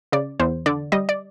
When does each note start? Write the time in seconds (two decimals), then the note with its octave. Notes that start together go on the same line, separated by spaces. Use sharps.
0.12 C#3 D5
0.40 E2 C5
0.66 D3 D5
0.92 G3 D#5
1.09 D5